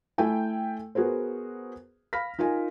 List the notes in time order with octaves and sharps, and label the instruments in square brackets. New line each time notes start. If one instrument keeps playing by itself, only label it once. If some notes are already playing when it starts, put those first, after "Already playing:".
[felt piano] A3 E4 G5 G#5
B3 F#4 G#4 A#4 C5
F5 B5 F6 A#6 B6
D#4 F4 A#4 G#5